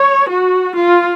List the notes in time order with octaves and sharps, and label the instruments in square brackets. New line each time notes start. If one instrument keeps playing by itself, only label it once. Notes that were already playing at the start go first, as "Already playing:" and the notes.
Already playing: [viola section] C#5
F#4
F4